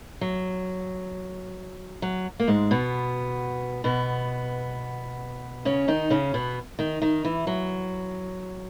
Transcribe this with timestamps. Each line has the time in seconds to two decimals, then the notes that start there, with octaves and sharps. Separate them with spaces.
0.21 F#3
2.02 F#3
2.40 A#3
2.47 G#2 G#3
2.71 B2 B3
3.84 B2 B3
5.65 C#3 C#4
5.88 D#3 D#4
6.10 C#3 C#4
6.34 B2 B3
6.79 D#3 D#4
7.02 D#3 D#4
7.25 E3
7.47 F#3